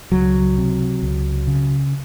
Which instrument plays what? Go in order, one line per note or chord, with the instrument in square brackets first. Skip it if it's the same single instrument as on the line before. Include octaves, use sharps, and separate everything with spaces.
[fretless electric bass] C#2 F#3
C3
C#2
C#3